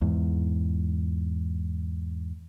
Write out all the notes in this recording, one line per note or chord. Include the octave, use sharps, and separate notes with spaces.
E2 G#2